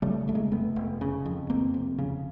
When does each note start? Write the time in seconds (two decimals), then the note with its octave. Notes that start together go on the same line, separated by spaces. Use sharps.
0.02 C#3 G3 A3
0.28 F1 A3
0.35 G#3 A#3
0.52 F1 A3 B3
0.76 F1
1.01 C#3
1.26 F2
1.50 F2 A#3 C4
1.74 F1
1.98 C#3